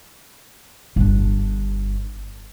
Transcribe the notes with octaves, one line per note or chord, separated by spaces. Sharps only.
G1 D4